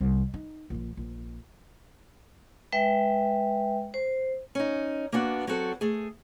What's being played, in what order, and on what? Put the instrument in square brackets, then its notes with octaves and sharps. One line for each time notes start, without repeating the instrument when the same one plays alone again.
[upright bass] C2
D#4
A#1 F3
A#1
[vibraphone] G#3 B4 E5 G5
C5
[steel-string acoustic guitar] C#4 D#4
A#3 B3 D4 F#4
F#3 C4 F#4 A4
A3 G#4